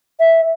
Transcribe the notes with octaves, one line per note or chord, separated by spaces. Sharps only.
E5